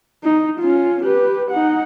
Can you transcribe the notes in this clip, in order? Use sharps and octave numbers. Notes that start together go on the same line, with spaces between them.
D#4
C#4 F4
G4 B4
D#4 F#5